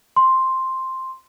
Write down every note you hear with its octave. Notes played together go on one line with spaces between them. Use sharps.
C6